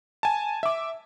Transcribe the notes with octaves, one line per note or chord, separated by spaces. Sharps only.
G#5 A5
E5 D6